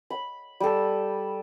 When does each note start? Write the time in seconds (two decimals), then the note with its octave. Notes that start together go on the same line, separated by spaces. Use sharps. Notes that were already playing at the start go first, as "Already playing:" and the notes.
0.10 B5
0.60 G3 A4